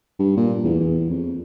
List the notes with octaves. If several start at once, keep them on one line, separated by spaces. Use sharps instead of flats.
G2
A#2
E2
E2
F2